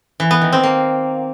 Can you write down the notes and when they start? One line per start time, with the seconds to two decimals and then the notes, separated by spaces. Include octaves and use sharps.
0.20 E3
0.31 B3
0.42 D#3
0.52 C4
0.63 A#3